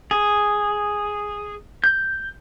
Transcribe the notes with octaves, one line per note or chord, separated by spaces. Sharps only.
G#4
G6